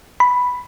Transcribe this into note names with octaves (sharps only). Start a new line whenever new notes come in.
B5